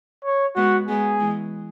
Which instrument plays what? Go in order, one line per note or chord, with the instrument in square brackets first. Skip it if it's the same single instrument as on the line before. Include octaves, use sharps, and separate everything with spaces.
[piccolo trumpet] C#5
[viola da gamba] G#3 B3 [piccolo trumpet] F#4
[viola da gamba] G#3 B3 [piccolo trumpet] G#4
[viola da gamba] E3 G#3